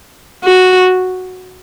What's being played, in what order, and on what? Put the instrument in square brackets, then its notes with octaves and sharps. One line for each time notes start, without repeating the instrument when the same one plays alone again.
[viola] F#4